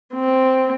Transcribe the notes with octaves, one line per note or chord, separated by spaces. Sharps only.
C4